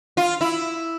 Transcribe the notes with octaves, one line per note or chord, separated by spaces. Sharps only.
F4
E4